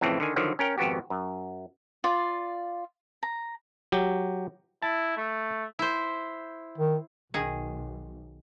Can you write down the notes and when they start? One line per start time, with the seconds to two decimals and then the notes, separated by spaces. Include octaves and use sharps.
0.01 F2 A2 C#3 E3 C4
0.20 D3 D#3 G#5
0.36 D3 D#3 F3 F#3
0.59 C#4 A#4 G5
0.78 G#1 F2 B3 F#4 G4
1.10 F#2
2.04 F4 D5
3.23 A#5
3.92 F#3 G4
4.83 E4 A5
5.17 A3
5.79 E4 C5
6.78 D#3
7.34 B1 D#3 G#4